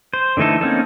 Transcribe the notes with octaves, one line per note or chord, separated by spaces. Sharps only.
C5
D3 E3 A3 D#4 A4
A#3 C4 C#4 D#4 A4